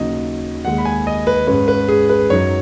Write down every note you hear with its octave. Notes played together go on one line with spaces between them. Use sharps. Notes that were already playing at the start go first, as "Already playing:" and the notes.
Already playing: D#2 C#3 F#3 D#4 D#5
D#2 D#3 G#3 F#5
B5
G#5
D#5
B4
G#2 G#3 C#4 B4
B4
G#4
B4
F#2 F#3 D#4 C#5